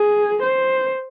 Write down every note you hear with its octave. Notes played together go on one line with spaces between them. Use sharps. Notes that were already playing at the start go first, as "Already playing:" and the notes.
Already playing: G#4
C5